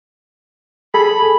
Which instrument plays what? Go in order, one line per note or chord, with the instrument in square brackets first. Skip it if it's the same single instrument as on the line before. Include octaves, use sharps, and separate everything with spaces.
[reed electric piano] G#4 A4 G#5 [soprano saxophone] B5